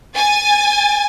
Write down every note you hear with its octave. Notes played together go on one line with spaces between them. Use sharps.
G#5 A6